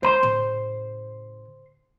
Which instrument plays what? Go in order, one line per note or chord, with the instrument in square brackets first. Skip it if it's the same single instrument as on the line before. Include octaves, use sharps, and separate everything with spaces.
[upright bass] G#3 D4 [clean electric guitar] C5 B5 C6
[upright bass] A2 C#3